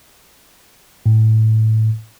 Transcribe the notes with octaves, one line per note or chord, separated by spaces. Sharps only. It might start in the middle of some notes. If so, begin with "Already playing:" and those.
A2